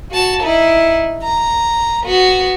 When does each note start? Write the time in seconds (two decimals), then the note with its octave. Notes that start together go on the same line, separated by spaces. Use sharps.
0.11 F#4 A5
0.43 D#4 E4
1.23 A#5
2.03 B3 F#4